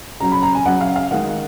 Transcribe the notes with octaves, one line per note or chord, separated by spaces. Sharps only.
C#3 F#3 C#4 A#5
B5
A#5
G#5
C#3 F#3 C#4 F#5
F5
F5
D#3 G#3 D#4 F#5